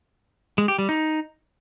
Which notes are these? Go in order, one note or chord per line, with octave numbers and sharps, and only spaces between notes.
G#3
G4
G3
D#4